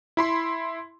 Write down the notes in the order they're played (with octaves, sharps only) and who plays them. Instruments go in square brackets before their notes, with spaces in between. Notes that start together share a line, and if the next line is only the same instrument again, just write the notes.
[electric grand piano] E4 B5 C6